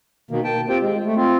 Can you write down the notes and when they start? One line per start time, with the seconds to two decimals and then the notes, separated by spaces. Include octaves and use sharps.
0.31 B2 D#3 A#3
0.44 G5 A5
0.69 C4 F4 G4 C5 G5
0.82 G#3
1.05 A3
1.16 C4 F4